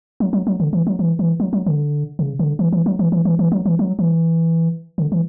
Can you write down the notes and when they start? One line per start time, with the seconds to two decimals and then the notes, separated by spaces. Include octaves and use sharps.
0.20 F#3
0.33 F#3
0.47 F#3
0.60 D3
0.73 E3
0.87 F#3
0.99 E3
1.19 E3
1.40 F#3
1.53 F#3
1.67 D3
2.19 C#3
2.39 D3
2.59 E3
2.73 E3
2.86 F#3
2.99 E3
3.12 E3
3.25 E3
3.39 E3
3.52 F#3
3.66 E3
3.79 F#3
3.99 E3
4.98 D3
5.12 E3